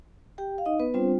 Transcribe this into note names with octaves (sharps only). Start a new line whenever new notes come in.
G4 G5
F5
D#4 D#5
B3 B4
G3 C4 D4 F4 C5